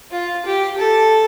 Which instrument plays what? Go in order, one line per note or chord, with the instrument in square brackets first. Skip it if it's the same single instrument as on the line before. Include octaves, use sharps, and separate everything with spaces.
[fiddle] F4
G4
A4